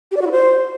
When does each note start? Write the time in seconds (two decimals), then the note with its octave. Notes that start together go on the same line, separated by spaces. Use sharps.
0.11 G4
0.16 D5
0.21 F#4
0.26 E4
0.31 C5